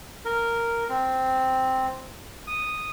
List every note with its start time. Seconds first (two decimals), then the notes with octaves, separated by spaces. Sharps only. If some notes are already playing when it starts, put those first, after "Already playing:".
0.25 A#4
0.89 C4
2.47 D#6